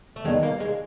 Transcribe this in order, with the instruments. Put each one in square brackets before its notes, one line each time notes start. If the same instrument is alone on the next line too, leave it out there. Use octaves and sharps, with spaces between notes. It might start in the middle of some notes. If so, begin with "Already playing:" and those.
[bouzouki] A3
[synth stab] D#2 D#3 G3 B3 D#4 [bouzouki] G#3
[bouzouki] A#3
G#3